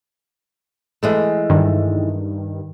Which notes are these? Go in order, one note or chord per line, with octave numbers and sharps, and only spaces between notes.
E3 G#3 A3
G2 D#3